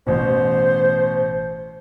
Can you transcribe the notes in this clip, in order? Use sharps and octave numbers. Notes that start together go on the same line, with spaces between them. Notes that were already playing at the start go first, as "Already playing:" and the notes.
A1 B2 C5